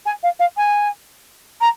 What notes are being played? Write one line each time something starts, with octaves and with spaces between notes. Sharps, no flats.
G#5
F5
F5
G#5
A#5